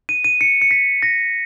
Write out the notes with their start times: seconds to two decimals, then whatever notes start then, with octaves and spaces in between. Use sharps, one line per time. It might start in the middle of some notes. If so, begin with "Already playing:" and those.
0.09 D#7
0.24 D#7
0.41 C#7
0.62 C#7
0.71 B6
1.03 A#6